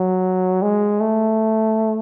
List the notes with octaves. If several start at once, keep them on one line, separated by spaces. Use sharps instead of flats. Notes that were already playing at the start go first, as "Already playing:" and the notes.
Already playing: F#3
G#3
A3